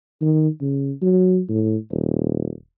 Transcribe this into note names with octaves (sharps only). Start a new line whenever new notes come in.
D#3
C#3
F#3
A2
D#1